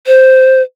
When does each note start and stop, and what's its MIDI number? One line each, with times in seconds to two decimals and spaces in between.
0.07 0.62 72